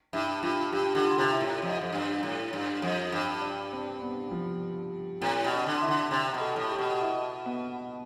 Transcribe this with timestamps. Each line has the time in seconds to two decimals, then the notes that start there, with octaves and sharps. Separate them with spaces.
0.13 G2 E4
0.43 G2 F4
0.73 G2 G4
0.95 D3 G4
1.03 F4
1.18 C3
1.32 E4
1.41 A2
1.62 F2
1.81 F2
1.92 G2
2.23 A2
2.53 G2
2.82 F2
3.12 G2
3.41 D4
3.73 C4
4.02 B3
4.32 F3
5.21 A2 C4
5.44 B2
5.51 D4
5.66 D3
5.82 E4
5.88 D3
6.11 C3 G4
6.34 B2
6.41 A4
6.56 A2
6.72 G4
6.78 B2
7.01 E4
7.46 B3